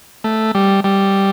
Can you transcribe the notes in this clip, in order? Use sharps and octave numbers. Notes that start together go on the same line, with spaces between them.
A3
G3
G3